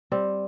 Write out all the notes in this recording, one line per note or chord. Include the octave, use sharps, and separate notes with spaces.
G3 C4